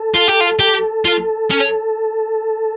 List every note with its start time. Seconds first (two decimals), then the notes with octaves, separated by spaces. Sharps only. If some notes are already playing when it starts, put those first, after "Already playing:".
Already playing: A4
0.14 F4
0.28 G4
0.40 F4
0.59 G4
1.05 F4
1.50 C#4